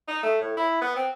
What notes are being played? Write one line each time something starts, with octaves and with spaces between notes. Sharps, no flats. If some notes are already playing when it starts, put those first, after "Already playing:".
D#4
A3
A2
E4
B3
C4